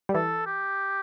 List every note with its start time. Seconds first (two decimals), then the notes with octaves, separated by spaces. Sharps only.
0.09 G3
0.14 E3 A4
0.46 G4